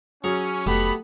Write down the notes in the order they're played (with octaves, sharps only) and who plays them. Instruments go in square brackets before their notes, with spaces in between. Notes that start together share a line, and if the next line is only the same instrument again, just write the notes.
[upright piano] F#3 [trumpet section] C#4 [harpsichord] G#4 A#5 C#6
[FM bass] F1 [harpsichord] A3 G4 [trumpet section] B3 B5